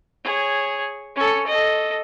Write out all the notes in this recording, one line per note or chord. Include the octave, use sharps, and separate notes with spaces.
G#4 C#5
C#4 A4
A4 D#5